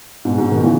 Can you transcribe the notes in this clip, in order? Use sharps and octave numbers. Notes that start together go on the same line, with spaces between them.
G#2 B2
G#2 B2
B2 D#3
C#3 E3